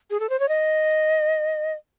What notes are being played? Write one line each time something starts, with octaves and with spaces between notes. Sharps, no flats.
G#4
A4
C5
C#5
D#5